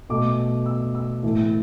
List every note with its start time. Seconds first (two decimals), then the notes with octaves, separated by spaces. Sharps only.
0.10 B2 A3 D6
0.66 E6
0.95 E6
1.23 A2 E3 A3